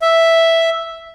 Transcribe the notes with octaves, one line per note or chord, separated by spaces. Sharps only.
E5